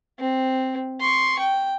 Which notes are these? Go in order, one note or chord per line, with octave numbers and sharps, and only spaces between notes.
C4
C6 C#6
G5